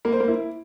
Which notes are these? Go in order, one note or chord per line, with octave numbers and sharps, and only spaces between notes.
A#3
C5
A#3
E4